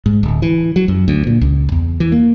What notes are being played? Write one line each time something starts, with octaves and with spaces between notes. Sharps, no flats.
G#2
D1
E3
F#3
F#2
D2
A#2
C#2
E2
E3
A#3